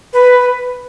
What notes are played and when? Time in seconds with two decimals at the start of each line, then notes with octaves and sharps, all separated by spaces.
0.13 B4